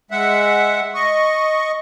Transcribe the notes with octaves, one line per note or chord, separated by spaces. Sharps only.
G#3 E5 F#5
D#5 C#6